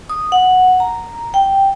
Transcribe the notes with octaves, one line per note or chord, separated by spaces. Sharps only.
D#6
F#5
A#5
G5